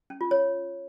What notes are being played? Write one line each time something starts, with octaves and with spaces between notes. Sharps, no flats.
C#4
F4
C#5